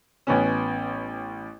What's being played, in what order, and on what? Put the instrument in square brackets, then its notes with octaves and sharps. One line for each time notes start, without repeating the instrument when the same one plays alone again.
[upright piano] A1 B3 C#4